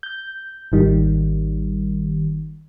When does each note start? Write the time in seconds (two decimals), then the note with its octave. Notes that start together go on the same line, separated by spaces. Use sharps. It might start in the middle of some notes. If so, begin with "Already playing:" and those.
0.03 G6
0.72 G#1 D#3 G3